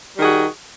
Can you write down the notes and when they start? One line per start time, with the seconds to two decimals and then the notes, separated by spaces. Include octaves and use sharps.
0.15 G3
0.18 D#3
0.20 G#4
0.23 F#4